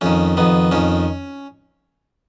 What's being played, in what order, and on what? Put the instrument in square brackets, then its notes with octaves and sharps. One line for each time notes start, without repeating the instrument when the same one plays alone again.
[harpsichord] F2 D#3 C#4
F2 D#3 B3
F2 D#3 C#4